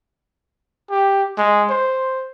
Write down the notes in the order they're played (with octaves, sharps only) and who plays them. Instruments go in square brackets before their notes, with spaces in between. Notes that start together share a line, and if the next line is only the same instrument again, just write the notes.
[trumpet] G4
G#3
C5